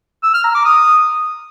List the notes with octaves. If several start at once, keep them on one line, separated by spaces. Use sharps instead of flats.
E6
F6
A#5
D6
D#6